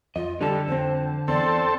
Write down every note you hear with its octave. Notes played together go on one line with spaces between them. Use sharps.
F2 F4 D#5
D3 G3 A4 A5
F2 C4 C5
E2 C4 A4 D5